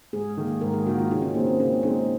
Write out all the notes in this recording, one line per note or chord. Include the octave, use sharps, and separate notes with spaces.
G#2 G#4
D#3 A#3
G#2 A#4
G#4
D#3 A#3 F#4
F4
C#3 D#4
C#4
G#3 A#3 C4
C4
C#3 C#4
G#3 C4 D#4